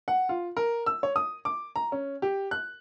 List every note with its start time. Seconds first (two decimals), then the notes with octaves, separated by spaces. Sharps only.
0.08 F#5
0.29 F4
0.57 A#4
0.86 E6
1.03 C#5
1.16 D#6
1.45 D6
1.76 A#5
1.92 C#4
2.22 G4
2.51 F#6